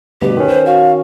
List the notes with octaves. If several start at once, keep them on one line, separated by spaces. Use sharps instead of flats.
D2 G2 B2 G4 B4
D#3 C#4
C5
F#4 F5